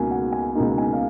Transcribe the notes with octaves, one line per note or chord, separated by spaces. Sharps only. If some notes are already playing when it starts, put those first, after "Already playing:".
Already playing: C#2 B2 A#3 D#4 G#5
F#5
G#5
C#2 B2 A#3 D#4
G#5
F5